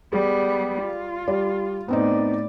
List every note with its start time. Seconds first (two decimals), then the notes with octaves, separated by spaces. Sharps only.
0.13 G3 B3 G#4
0.82 F4
1.28 G3 D5
1.88 A2 B3 C4 D#4 D5